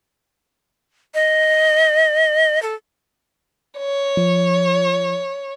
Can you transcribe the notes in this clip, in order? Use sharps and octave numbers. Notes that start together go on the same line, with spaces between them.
D#5
A4
C#5
F3